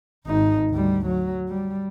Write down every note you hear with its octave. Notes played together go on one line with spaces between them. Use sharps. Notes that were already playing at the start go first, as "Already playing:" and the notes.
G#1 D#4
D2 G3
F#3
G3